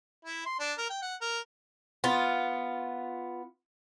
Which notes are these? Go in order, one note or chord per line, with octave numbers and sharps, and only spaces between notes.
E4
C6
D4
A#4
G5
F#5
A#4
B3 F4